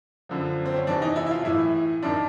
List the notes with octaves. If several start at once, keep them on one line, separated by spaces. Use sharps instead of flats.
F#2 D3 F3
C4
C#4
E2 C3 E3 D4
D#4
E4
E4
F4
A2 E3 E4
F#2 D#3 D4